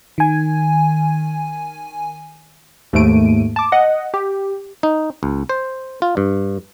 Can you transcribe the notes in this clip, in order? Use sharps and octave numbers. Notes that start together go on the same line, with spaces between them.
D#3 G#5
D#2 G#2 A3 D7 D#7
A5 D6
D#5 F#5
G4
D#4
C#2
C5
F4
G2